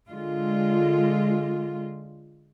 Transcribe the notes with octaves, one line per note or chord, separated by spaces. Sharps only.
D3 G#3 F4